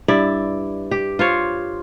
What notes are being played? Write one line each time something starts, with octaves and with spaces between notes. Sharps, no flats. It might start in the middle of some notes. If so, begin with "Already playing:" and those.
G2 E4 D5
G4
F4 C5 C#5